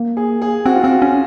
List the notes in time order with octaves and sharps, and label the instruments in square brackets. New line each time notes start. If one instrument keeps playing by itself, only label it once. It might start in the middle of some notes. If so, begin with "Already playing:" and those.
Already playing: [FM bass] A#3
[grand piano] G#4
G#4
[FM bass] C4 [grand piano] F#4
[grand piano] F4
[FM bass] C4 [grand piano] F#4
[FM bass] C#4